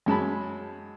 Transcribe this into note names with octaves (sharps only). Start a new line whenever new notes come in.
F#2 G#3 A5 B5